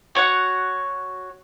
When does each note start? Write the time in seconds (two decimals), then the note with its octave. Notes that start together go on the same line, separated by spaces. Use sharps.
0.15 F#4 C#5 F#5